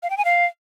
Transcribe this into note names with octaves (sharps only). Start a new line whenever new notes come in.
F5
G5
G#5
F5